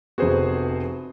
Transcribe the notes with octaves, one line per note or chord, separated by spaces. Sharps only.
F1 B3 F#4 G#4 C5